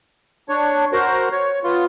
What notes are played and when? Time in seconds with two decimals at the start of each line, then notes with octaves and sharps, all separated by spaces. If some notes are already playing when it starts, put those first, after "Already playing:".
0.49 D4 C#5
0.92 F#4 A#4 C5
1.32 C#5
1.64 B3 F4